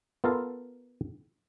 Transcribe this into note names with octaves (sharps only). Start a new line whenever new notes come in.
B3 F4 A4 A#4 F5 A5